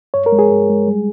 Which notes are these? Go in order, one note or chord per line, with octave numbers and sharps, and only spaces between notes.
G2 C#5
A#4
G#3
G#4
G2
G#3
G3